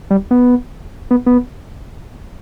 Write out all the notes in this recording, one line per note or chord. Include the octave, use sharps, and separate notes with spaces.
G3
B3
B3
B3